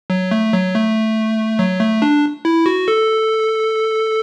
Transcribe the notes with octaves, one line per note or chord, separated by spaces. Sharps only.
F#3
A3
F#3
A3
F#3
A3
D4
E4
F#4
A4